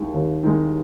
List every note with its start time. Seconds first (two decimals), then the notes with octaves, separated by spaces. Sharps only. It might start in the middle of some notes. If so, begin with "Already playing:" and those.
Already playing: D#2 D#3 G#3
0.14 D#2
0.43 D#3 G#3